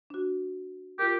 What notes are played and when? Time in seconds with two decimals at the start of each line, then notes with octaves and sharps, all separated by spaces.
0.10 D4 F#4
0.99 F4 G4 A#4